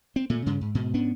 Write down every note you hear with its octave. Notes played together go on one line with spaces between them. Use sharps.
C4
A#2 A3
G2 C#3
G#2
G#2 B2
G#2 B3 C#4 D4